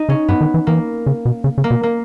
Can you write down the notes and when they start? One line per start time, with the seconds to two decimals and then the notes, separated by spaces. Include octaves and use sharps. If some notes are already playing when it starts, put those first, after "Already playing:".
Already playing: D#4
0.09 C#3 C#4
0.28 G2 B3
0.41 D#3
0.54 E3
0.67 E3 A#3
1.06 C#3
1.25 B2
1.44 C#3
1.58 C#3
1.64 A#3
1.71 B2
1.83 A#3